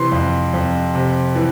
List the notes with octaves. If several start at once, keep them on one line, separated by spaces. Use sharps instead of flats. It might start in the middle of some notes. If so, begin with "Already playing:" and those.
Already playing: C3 E3 C6
F2
F2
C3
E3